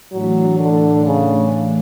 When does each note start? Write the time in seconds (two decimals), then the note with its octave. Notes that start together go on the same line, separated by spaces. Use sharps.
0.12 A2 E3 F#3 A3 D4
0.59 D3
1.06 C#3